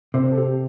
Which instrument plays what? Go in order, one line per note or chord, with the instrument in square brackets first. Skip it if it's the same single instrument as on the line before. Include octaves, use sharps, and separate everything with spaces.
[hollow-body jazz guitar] C3 [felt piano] C4 C5
[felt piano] A4
G4